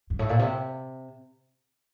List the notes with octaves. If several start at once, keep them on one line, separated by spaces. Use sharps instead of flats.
G2
A2
A#2
C3